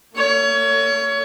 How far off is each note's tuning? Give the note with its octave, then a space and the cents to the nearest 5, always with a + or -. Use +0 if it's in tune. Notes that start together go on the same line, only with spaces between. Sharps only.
A#3 -40 C#5 +25